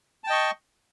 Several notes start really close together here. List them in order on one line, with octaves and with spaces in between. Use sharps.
A5 G5 D#5 C#6